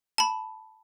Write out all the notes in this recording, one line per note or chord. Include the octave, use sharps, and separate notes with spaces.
A5 B5